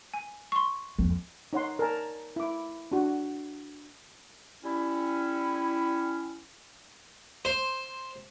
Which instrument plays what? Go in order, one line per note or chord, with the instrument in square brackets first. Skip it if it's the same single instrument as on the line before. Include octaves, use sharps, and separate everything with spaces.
[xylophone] G#5
C6 C#6
[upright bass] F2
[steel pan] D#4 C#5 F#5 C6
A#4 D5 G#5 A5
E4 D6
D4 F#4
[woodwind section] G3 C#4 E4
[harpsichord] C5